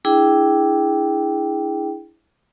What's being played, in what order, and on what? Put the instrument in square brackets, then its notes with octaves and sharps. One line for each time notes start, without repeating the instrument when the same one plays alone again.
[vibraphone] D4 E4 G#4 G5